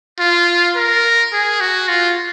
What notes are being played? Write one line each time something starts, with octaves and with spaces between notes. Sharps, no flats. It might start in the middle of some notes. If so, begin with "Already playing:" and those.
F4
A#4
G#4
F#4
F4